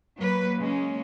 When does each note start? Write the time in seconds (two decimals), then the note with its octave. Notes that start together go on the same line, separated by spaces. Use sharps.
0.19 F#3 A#3 B4
0.58 C#3 G#3 A#3 C#4